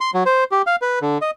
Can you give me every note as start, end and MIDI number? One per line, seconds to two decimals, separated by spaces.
0.01 0.11 84
0.14 0.24 54
0.26 0.44 72
0.51 0.62 67
0.67 0.76 77
0.82 0.99 71
1.02 1.18 50
1.21 1.31 75